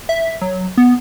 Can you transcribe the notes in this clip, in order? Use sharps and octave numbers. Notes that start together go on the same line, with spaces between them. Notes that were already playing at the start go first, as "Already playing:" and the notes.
E5
F#3
B3